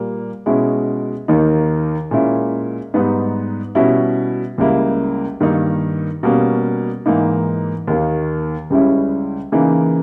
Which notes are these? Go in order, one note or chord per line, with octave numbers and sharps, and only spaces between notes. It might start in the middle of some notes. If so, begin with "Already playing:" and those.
Already playing: A#2 G3 A#3
B2 G#3 C#4 E4
D#2 D#3 A#3 D#4
A#2 G#3 C#4 E4
G#2 G3 B3 D#4
B2 G3 C#4 E4
C#2 C#3 G3 A#3 E4
G2 D#3 A#3 D#4
B2 G3 A#3 C#4
G#2 E3 A#3 D#4
D#2 D#3 A#3
C#2 C#3 G3 C#4 E4
C#3 E3 A#3 D#4